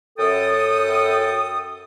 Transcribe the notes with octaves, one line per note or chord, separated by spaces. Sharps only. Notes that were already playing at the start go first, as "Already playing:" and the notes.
F#2 A4 G5 D#6